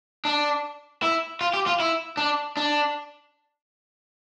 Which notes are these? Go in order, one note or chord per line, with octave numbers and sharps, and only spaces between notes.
D4
E4
F4
G4
F4
E4
D4
D4